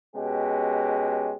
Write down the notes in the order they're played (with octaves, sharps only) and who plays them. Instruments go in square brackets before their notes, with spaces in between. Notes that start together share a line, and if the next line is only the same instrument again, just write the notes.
[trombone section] B2 G#3 C#4 G4